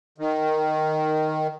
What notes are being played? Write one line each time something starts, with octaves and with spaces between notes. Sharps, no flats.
D#3